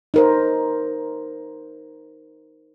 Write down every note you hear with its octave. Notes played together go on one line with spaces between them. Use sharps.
D#4 A#4 C5